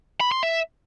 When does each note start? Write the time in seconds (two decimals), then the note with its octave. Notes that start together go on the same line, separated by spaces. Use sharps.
0.20 B5
0.32 C6
0.43 E5